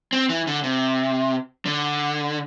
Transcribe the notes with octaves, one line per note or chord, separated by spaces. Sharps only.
C4
E3
D3
C3
D3